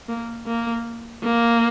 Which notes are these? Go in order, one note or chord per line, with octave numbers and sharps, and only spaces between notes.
A#3
A#3
A#3